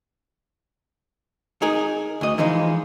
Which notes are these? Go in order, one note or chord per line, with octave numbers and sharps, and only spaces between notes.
D#4 G#4 A#4
D2 D#5
E3 F3 G#3 D#4